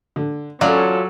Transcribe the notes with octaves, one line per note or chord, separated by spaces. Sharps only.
D3
F#3 C#4 F4 F#4 A4 C#5 D5 F5